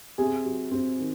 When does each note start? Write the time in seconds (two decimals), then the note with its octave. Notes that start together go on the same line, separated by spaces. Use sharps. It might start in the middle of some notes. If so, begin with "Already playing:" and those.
0.18 C3 G#4
0.45 F#3
0.71 C4
0.99 D#3